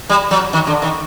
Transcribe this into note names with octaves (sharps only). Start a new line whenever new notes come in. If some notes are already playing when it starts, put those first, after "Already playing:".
G3
F#3
D#3
D3
D#3